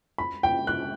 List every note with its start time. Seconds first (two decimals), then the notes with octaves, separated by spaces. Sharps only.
0.18 B5
0.43 G5
0.67 F#6